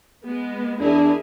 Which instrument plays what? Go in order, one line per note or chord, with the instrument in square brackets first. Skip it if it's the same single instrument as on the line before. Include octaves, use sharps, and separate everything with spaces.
[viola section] G#3 B3
[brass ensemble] E2 D4 [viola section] E4 G#4 A#4